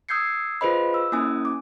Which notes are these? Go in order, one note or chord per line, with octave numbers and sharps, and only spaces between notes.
D#6 E6 G6 G#6 C7 C#7
F4 G#4 B4 C5 D#5 B5
E6
A#3 C#4 E4 G#5 D#6
D6